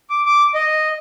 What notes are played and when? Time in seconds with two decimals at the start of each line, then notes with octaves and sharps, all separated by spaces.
0.10 D6
0.26 D6
0.54 D#5